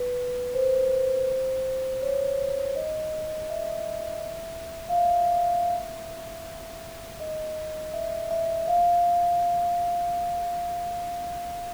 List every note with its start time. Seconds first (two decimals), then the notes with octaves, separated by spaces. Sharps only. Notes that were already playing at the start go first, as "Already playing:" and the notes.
Already playing: B4
0.54 C5
2.02 C#5
2.76 D#5
3.50 E5
4.89 F5
4.98 E5
7.20 D#5
7.94 E5
8.31 E5
8.68 F5